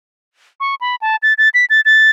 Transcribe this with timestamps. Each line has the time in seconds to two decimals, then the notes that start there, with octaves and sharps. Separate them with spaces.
0.60 C#6
0.81 B5
1.01 A5
1.23 A6
1.38 A6
1.54 B6
1.70 A6
1.85 A6